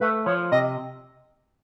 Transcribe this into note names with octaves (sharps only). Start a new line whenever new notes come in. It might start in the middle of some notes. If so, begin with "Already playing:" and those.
A3 B4
F3 C#5
C3 D#5